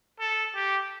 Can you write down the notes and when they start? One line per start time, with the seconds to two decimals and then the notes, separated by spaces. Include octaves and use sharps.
0.20 A4
0.55 G4